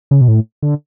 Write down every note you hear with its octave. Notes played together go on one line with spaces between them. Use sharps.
C#3
B2
A2
D3